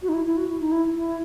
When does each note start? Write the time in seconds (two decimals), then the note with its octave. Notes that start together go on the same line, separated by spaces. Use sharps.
0.02 F#4
0.09 D#4
0.14 E4
0.25 E4
0.37 F#4
0.49 E4
0.60 D#4
0.72 E4
0.95 E4